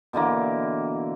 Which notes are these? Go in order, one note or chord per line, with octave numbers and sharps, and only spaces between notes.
B2 D3 E3 A#3